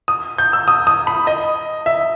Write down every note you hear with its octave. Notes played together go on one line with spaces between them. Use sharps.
D#6
G6
E6
D#6
D#6
B5
D#5
E5